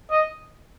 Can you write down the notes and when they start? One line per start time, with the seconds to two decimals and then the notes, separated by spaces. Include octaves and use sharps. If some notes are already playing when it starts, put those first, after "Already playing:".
0.10 D#5